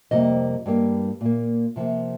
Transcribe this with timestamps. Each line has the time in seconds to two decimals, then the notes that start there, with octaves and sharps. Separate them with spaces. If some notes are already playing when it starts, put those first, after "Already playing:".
0.11 F2 C3 G3 A#3 D#5
0.66 G2 G3 A#3
1.21 A#2 A#3
1.76 C3 F3 A#3